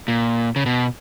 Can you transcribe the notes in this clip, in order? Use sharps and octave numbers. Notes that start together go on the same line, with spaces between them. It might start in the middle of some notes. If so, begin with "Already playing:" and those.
A#2
C#3
B2